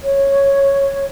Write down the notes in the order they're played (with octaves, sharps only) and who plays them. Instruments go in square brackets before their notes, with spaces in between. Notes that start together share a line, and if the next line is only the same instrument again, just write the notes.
[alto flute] C#5